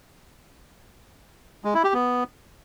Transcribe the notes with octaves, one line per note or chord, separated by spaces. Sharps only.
G#3
E4
G4
B3